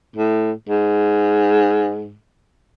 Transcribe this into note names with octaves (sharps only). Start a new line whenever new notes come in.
A2
G#2